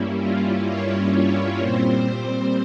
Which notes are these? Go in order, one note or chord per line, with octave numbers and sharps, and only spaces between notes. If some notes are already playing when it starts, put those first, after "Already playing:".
Already playing: G2 G3 A#3 C#4 E4
F4
C#5
A#2 G3 C4 C5